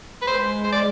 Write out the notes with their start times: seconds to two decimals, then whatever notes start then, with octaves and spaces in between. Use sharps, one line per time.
0.22 B4
0.27 G#3 C5
0.64 C5
0.72 D5